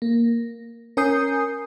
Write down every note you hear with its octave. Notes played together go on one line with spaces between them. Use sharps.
A#3
C#4 A#4 G#5 D#6 G6 C7